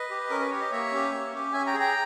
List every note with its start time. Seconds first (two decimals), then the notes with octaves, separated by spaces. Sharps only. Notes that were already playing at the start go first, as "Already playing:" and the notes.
Already playing: B4 D#5
0.10 G4
0.30 C#4 A#4
0.40 B4
0.50 G4 C#5
0.60 D#5
0.71 A#3 C#5 E5
0.92 C#4 G4
1.12 A#3
1.33 C#4 G4
1.53 C#4 E5 G#5
1.67 G5 A#5
1.73 G#4
1.80 G5 A#5